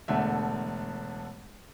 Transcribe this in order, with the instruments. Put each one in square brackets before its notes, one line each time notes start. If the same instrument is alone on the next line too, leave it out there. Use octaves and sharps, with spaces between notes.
[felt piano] E1 D3 A3 E5